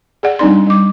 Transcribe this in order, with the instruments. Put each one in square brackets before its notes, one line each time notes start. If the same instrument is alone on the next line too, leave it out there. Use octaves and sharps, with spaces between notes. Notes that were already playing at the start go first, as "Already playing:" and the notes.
[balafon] G#4 D5 F#5
G3 C4 D4 D#4 D5 C6
G3 D6